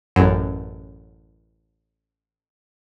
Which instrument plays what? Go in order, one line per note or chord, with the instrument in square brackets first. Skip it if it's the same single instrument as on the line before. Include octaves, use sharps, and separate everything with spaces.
[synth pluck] A1 F#2